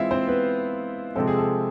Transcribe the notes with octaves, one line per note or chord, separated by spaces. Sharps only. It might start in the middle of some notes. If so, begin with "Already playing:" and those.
Already playing: E3 G#3 C4 E4 F4 E5 F5
C4 C5
B3 B4
C3 F3 G#3 C4 A4
G#4
A4